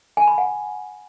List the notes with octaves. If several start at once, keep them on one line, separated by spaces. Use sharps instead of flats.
G#5
B5
F#5